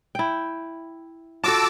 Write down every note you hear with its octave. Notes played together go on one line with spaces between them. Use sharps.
E4 G5
F4 F#4 A4 A5 D6 E6